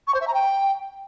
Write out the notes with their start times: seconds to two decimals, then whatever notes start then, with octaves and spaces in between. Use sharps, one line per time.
0.07 C#6
0.14 C5
0.21 E5
0.27 A#5
0.34 G5